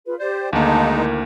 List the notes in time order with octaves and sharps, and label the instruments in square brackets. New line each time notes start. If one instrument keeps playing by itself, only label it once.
[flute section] F4 G#4 B4
[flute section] G4 D5 [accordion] C5
[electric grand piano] D2 D#3 A#3 [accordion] G#3 D#4 [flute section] F5 A5
[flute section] D4 E4 A#4